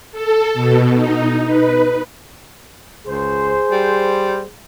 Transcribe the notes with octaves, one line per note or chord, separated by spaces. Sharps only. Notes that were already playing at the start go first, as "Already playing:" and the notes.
A4
B2
D#4
B4
C#2 G#4 C5
G3